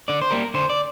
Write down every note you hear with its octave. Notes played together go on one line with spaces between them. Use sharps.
D3 D5
C5
G3 A#3 A#4
D3 C5
D5